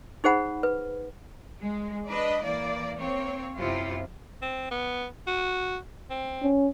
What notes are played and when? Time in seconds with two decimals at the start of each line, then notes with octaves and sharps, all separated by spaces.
0.24 D#4 G#4 C5 F#5 B5
0.63 B4
1.60 G#3
2.07 D4 B4 D#5
2.42 E3 A#3 D5
2.98 A#3 C4 C#5
3.56 F#2 C3 E4 F4
4.42 C4
4.71 B3
5.27 F#4
6.10 C4
6.42 C#4